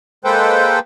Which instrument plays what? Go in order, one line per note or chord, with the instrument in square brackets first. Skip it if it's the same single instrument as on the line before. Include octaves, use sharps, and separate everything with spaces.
[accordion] G#3 A#3 A4 B4 C5 G5